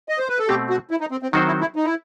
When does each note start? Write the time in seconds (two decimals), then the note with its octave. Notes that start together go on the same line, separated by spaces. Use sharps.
0.09 D#5
0.18 C5
0.29 B4
0.39 A4
0.48 B2 A3 C4 G4
0.70 F#4
0.91 E4
1.01 D#4
1.11 C4
1.23 C4
1.33 D#3 F#3 C4 D#4 F#4 C5
1.47 E4
1.61 E4
1.76 D#4
1.85 E4